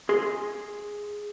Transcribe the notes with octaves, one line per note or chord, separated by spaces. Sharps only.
G#4 C6